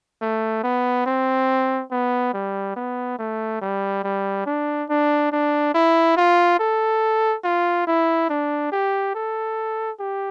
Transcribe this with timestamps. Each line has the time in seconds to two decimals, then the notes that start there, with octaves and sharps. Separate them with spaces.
0.21 A3
0.63 B3
1.06 C4
1.91 B3
2.34 G3
2.76 B3
3.19 A3
3.61 G3
4.04 G3
4.46 D4
4.89 D4
5.32 D4
5.74 E4
6.17 F4
6.59 A4
7.44 F4
7.87 E4
8.29 D4
8.72 G4
9.15 A4
10.00 G4